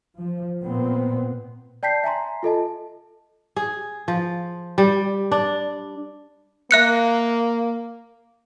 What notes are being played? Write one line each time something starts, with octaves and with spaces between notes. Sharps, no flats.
F3
A#2 B3 C4
D5 G5 A5 G6 B6 C7
E5 G#5 A#5 C6
F4 A4 D#5 A5
G#4
F3
G3
D4
A#3 E5 F#6 C#7